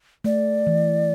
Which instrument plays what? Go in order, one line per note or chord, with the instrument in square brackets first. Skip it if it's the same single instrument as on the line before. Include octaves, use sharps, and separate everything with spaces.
[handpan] A3 [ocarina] D5
[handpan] E3